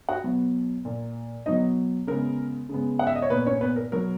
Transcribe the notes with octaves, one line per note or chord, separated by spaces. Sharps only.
F#4 F#5
B2 F#3 B3
A#2 A#3
B2 F#3 B3 D#4 D#5
C#3 G#3 B3 A#4
C#3 G#3 B3
F#5
E5
D#5
C#5
A#2 A#3 B3 B4
C#4 C#5
B3 B4
A#4
B2 F#3 B3 A#4